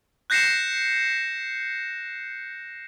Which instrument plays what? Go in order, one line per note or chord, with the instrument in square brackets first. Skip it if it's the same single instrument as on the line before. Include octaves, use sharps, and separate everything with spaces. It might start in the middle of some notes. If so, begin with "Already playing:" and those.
[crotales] F#6 G6 A#6 C7 C#7 E7